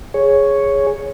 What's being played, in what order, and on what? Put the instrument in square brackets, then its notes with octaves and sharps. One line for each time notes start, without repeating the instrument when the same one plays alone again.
[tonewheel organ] G#4 C#5